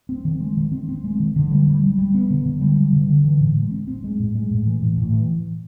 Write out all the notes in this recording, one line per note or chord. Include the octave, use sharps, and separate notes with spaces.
C4
D#3
G#3
D#3
C4
C4
G#3
D#3
D3
G3
G3
G3
G3
B3
D3
D3
G3
G3
D3
D3
E3
A2
G#3
C4
C4
G#3
A2
G#3
A2
E3
A2
A2
E3